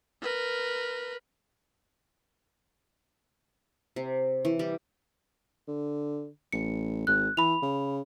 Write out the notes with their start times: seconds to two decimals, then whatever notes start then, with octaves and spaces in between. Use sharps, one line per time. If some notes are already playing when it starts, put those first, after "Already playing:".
0.22 A#4 B4
3.96 C3
4.45 E3
4.59 G3
5.68 D3
6.52 A1 C#7
7.07 G#1 F#6
7.37 E3 B5 F7
7.62 C#3